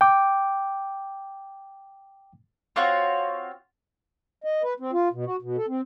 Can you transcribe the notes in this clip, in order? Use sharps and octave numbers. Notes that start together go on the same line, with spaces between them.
G5 D6
C4 F4 F#4 C#5
D#5
B4
C4
F4
B2
F#4
B2
A4
C4